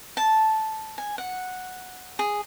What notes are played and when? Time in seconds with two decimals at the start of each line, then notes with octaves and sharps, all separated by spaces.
0.17 A5
0.98 G#5
1.18 F#5
2.19 G#4